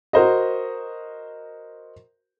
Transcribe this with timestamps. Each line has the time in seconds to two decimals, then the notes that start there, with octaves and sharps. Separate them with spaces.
0.13 F#4 A#4 C5 D#5